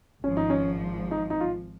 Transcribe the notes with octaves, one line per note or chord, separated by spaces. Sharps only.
G#1 G#2 F3 C#4
D#4
C#4
D#4
D#4
F4